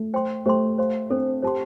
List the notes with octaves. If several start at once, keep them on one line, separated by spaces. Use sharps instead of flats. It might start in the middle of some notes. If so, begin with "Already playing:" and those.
Already playing: A3
C5 G5 C6
A3 G4 C5 G5 C6
C5 F5 C6
C4 D4 A4 C5
G4 C5 A5 C6